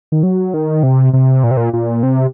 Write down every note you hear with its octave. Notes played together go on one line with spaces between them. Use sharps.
D#3
F#3
D#3
C3
C3
A#2
C3
A#2
A#2
C3